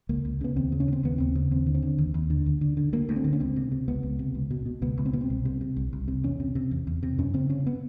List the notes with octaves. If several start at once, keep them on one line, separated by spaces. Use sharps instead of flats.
C#2 A#3
C#2
C#3 B3
D#2 C4
C#3
C#4
C#3 C4
D#2 B3
D#2 C4
C#3
D#2 C4
D3
C4
D3
D#2
D#2
D3
D2
D3
D3
D2 A#3
D2
C4
D3
C#4
C#2 C4
C3
C3
C#2 B3
C#2
C3
C#2
B2
B2
C#2 B3
C#2
C4
B2 B3
C4
C2
C3
C3
C2
C2
C3
E2 C#4
C3
C3
E2
E2
C3
F#2 C#4
C#3 C4
C#3 C#4
B3